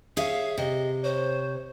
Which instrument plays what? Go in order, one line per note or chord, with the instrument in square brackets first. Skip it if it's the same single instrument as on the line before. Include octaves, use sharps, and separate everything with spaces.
[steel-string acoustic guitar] G#4 C#5 E5 [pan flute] F5
[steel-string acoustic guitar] C3 [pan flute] D#5
[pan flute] C5 [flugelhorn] C#5